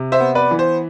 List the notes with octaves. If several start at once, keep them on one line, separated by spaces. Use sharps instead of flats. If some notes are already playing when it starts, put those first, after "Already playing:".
Already playing: C3
C5 E5
B3
B4 D5
E3
C5